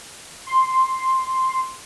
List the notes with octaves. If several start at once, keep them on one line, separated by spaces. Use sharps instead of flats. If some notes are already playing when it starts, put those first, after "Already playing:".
C6